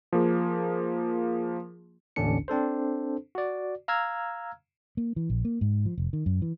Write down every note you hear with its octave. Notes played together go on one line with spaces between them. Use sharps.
F3 A#3 G#4
A1 D#2 D3 C#4 D4 C#7
C4 D4 A4 C5
F#4 D5
F5 A#5 E6 F6 G#6
A#3
E3
A#1
A#3
G#2
F3
F1
D#3
F#2
E3